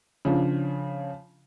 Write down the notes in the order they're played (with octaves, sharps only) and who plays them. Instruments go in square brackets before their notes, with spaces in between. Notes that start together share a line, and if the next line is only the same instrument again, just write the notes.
[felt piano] C#3 F3 D4